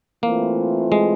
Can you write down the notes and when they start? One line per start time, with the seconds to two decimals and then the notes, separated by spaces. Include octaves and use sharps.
0.23 E3 A3 A#3 C4 F4
0.92 G#3